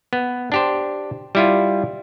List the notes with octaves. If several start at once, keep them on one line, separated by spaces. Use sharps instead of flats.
B3
D4 G4 C5
G3 E4 F4